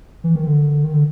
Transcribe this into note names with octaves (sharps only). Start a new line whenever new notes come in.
E3
D#3
D3
D#3
D3